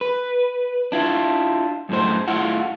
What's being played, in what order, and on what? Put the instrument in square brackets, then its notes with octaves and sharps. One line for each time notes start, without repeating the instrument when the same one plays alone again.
[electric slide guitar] B4
D4 E4 F4
F#2 A2 C5
A2 E4 F4 F#5